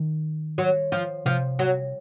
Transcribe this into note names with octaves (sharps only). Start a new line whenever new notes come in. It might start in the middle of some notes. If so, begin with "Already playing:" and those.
Already playing: D#3
F#3
F3
C3 F3
F#3